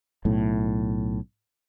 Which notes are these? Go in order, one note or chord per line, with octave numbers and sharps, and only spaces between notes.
B1 A2